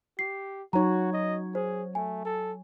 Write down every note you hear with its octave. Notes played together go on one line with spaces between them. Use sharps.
G4 C7
F#3 D#4 F#4 C#5 A#5
D#5
G#4 C5
A3 G#5
A4